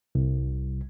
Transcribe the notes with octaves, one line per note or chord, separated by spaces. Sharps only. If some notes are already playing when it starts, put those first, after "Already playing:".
C2